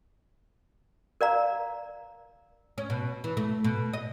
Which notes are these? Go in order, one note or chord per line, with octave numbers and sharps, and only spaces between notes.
A#4 D5 F5 A#5
C#4
B2
E3
A3
B2
D#5